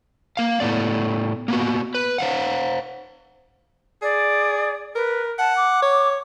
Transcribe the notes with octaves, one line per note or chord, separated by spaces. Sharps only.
A#3 F5
A2 A3 B3 D5
A#3 B3 F#4
B4
C5 F5 F#5
G#4 D5
A#4 B4
F#5 A5
D6
C#5